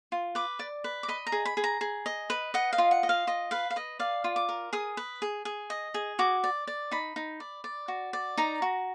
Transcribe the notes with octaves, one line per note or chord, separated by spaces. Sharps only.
F4
B4 D6
D5
B4
D6
D#5 B5
A#5
G#4
B5
G#4
A#5
G#4
D#5
B4
D#5 F#5
F5
F4
F#5
D#5
F5
F4 D#5
B4 F5
F5
B4 D#5
D5 F5
F4
D6
A#4
G#4 D#6
B4
G#4
G#4
D#5
G#4
F#4 D6
D5
D5
D#4 B5
D#4
D5
D5
F#4
D5
D#4 A#5
F#4